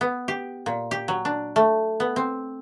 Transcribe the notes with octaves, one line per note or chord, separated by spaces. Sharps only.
B3
G4
A#2
G4
F#3
D4
A3
B3
C4